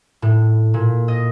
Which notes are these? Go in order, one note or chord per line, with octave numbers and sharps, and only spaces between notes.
A2
A#2
D#5